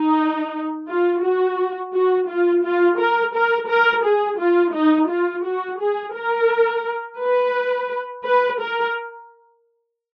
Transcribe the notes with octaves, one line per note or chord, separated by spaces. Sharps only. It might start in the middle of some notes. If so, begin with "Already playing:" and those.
Already playing: D#4
F4
F#4
F#4
F4
F4
A#4
A#4
A#4
G#4
F4
D#4
F4
F#4
G#4
A#4
B4
B4
A#4